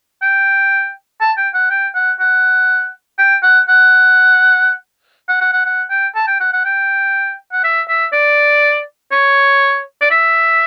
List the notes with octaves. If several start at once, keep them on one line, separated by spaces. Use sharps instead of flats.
G5
A5
G5
F#5
G5
F#5
F#5
G5
F#5
F#5
F#5
F#5
F#5
F#5
G5
A5
G5
F#5
F#5
G5
F#5
E5
E5
D5
C#5
D5
E5